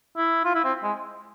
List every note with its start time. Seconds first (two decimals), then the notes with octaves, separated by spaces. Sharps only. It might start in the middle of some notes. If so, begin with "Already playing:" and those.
0.17 E4
0.45 F4
0.55 E4
0.64 C4
0.83 G#3